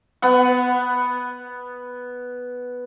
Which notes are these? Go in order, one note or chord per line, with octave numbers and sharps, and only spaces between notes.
B3 F#5